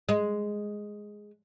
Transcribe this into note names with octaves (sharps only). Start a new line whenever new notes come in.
G#3